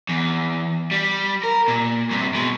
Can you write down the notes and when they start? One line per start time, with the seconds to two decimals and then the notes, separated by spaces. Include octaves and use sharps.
0.09 E2
0.91 G3
1.44 A#4
1.68 A#2
2.11 G2 C3
2.35 B2 G#3